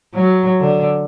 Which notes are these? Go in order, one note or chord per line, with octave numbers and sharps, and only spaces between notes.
F#3
D3